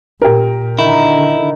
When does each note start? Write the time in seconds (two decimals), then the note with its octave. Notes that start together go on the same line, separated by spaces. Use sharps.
0.22 A#2 G4 A#4
0.79 D3 D#3 E4